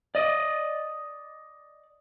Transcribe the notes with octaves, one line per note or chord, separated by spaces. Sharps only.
D5 D#5